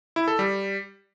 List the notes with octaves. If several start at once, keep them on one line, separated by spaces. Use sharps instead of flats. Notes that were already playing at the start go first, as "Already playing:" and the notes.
E4
A4
G3